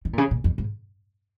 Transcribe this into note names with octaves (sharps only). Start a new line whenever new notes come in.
D#3
A#2
C#3
A#2
F2
G#2